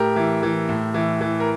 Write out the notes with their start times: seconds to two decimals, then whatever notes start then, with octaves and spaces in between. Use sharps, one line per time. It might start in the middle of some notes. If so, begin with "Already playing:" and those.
Already playing: A2 G4 A#4
0.16 E3
0.43 E3
0.69 A2
0.94 E3
1.21 E3
1.40 A#4